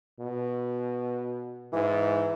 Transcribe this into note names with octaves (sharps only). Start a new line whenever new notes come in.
B2
G#2 E3